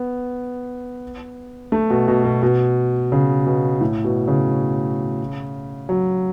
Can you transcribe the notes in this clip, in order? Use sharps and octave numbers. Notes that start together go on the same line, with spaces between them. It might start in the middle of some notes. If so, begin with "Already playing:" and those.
Already playing: B3
A3
B2
B2
B2
B2
C#3
B2
A2
B2
C#3
F#3